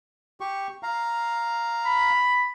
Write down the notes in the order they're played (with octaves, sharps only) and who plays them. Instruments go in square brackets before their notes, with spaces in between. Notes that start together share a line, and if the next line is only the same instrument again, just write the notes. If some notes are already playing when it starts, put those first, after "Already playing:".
[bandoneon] G4 C#6
F5 A#5
[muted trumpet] B5